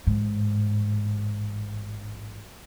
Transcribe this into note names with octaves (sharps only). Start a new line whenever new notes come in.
A1 G#2